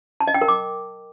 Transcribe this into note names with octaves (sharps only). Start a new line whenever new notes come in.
A5
D#5
G5
A#4
D6